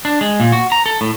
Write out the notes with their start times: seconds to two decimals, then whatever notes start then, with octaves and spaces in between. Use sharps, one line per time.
0.05 D4
0.21 G#3
0.40 A#2
0.52 F#4
0.72 A#5
0.86 A4
1.01 A2